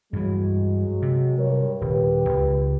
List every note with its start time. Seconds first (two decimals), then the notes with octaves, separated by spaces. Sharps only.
0.13 G2 E3 F#3 G#3
1.02 C3
1.39 G2 A#4 C#5
1.81 D#1 G4 B4
2.29 C#2